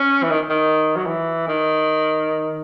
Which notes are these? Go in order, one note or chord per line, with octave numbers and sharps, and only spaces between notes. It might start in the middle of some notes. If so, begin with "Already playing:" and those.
Already playing: C#4
E3
D#3
D#3
F#3
E3
D#3